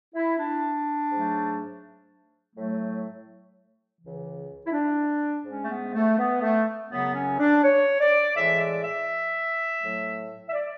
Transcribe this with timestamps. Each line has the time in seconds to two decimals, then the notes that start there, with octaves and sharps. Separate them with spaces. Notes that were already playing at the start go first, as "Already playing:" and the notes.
0.14 E4
0.38 D4
1.11 G#2 F#3 A3
2.55 A2 F#3 A3
4.00 C#2 C#3 E3
4.66 E4
4.72 D4
5.45 G#2 G#3 C#4
5.62 A3
5.69 B3
5.94 A3
6.18 B3
6.42 A3
6.90 F#2 C#3 F#3 B3
7.14 C#4
7.39 D4
7.63 C#5
7.99 D5
8.35 A2 E3 G#3 E5
8.60 D5
8.84 E5
9.80 A2 F#3 A3
10.49 E5
10.53 D5